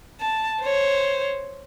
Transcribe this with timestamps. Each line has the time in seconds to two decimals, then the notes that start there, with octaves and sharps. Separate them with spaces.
0.20 A5
0.62 C5 C#5